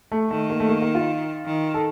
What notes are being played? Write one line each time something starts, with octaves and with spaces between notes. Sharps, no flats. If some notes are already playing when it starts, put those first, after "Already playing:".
A3
D#3 A3
A#3
A3
A#3
A#3
F4
D#3
A4